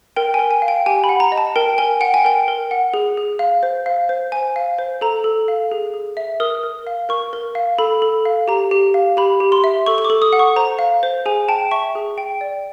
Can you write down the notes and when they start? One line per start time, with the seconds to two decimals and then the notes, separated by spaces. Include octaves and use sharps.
0.16 A#4 G5
0.34 G#5
0.39 A#4
0.51 G#5
0.62 F5
0.68 G5
0.86 G4 G#5
1.04 B5
1.09 F#5
1.20 A#5
1.32 D#5
1.38 A5
1.56 A#4 G5
1.78 A#4 G#5
2.01 F#5 G5
2.14 G#5
2.25 A#4 G5
2.48 A#4
2.71 F#5
2.94 G#4
3.17 G#4
3.39 F5
3.63 C5
3.86 F5
4.09 C5
4.32 C5 G#5
4.56 F5
4.78 C5
5.01 A4 A#5
5.24 A4
5.48 F5
5.71 G#4
5.94 G#4
6.17 E5
6.40 A#4 D#6
6.63 A#4
6.87 F5
7.09 A#4 C#6
7.33 A#4
7.55 F5
7.79 A4 B5
8.02 A4
8.25 F5
8.48 G4 A#5
8.71 G4
8.94 F5
9.17 G4 B5
9.40 G4
9.52 C6
9.64 E5
9.86 A4 C#6
9.98 C#6
10.05 D6
10.10 A4
10.22 D#6
10.33 F#5
10.39 C#6
10.56 C5 A#5
10.79 F5
11.03 C5
11.26 G#4 G#5
11.48 G5 A5
11.71 E5 C#6
11.95 G#4
12.18 G5
12.41 D5